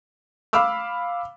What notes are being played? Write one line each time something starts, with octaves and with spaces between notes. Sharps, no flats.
F5 B5 D6 E6 F6